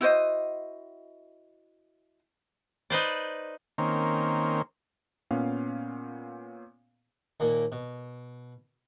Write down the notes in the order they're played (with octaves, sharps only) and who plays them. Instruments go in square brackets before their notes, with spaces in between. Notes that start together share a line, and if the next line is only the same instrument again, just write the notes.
[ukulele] E4 F#4 C5 D#5
[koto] D#4 B4 C5 D5
[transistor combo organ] D#3 A#3 C4 C#4
[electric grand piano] A#2 B3 C#4 F5
[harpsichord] D#2 A#2 A#3
B2